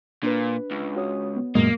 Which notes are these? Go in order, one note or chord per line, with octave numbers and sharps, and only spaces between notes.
A#2 D4 B4
C#2
F#4 C#5 D#6
B3
F#2 A#2 G#3 A#3